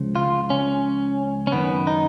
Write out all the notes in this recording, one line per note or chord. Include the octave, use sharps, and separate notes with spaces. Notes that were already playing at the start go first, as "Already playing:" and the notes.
Already playing: C#2 C#3 F3
F4
C#4
C#4
F#2 D#3 B3
D#4